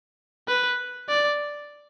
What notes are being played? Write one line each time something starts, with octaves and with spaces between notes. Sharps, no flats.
B4
D5